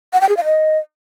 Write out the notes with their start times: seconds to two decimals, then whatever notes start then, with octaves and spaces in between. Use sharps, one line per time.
0.13 F#5
0.21 G5
0.29 G#4
0.37 F5
0.45 D#5